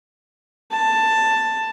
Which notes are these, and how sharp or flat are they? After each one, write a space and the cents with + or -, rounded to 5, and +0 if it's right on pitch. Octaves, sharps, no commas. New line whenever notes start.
A5 +10